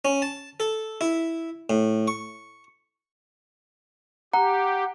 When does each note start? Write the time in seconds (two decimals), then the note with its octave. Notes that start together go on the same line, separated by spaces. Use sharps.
0.05 C#4
0.22 A5
0.60 A4
1.01 E4
1.70 A2
2.08 C#6
4.33 G4 F#5 A#5